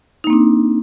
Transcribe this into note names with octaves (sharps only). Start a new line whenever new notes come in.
A#3 C4 D4 D#4